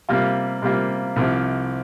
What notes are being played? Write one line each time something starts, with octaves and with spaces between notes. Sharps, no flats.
C3 G3 A#3 F4
C3 G3 A#3 F4
C2 C3 F3